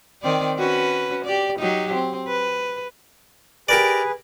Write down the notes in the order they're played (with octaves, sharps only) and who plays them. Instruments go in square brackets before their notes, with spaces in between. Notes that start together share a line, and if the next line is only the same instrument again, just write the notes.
[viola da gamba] D#3 C4 D5
C#4 F#4 B4
G4 D5
F#3 D#4 G4
C4
B4
[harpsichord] G4 A#4 D5 [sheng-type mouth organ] G#4 B4